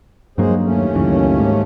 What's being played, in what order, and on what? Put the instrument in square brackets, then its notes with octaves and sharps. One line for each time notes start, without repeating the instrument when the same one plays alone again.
[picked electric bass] G2 F#3 A#3 [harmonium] G#3 G#4 C5
[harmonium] D#2 A3 C#4
[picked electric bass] C#2 F#2 E3
G#2